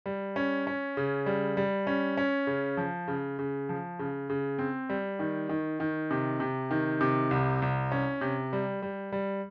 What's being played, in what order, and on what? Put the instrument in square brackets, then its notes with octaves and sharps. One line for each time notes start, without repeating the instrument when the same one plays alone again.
[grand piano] G3
C#4
C#4
C#3
G3
G3
C#4
C#4
C#3
F3
C#3
C#3
F3
C#3
C#3
C4
G3
D#3
D#3
D#3
C3
C3
D#3
C3
C2
C2
C#4
C3
G3
G3
G3